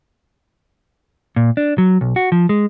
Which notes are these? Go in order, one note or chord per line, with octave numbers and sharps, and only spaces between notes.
A#2
D4
F#3
B1
F#4
F3
G#3